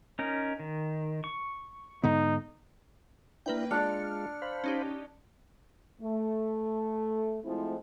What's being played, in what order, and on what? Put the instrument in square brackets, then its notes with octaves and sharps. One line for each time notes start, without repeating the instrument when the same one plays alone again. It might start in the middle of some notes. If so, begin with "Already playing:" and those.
[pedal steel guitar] C#4 D#4 A#4
D#3
C#6
[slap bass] G#2 D3 B3 [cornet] D#4
[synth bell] A#3 B4 G5 [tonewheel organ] D4 E4
[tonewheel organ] G#3 F4 [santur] D4 D5 [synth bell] F6 C#7
[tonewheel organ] C5 F5 B5
[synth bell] C#4 D#4 G4
[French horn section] A3
F3 G#3 A3 C4 E4